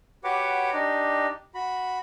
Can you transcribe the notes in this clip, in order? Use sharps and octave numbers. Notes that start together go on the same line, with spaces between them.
F#4 G4 B4 C#5 F#5 D6
D4 D#4 G4
F#4 B5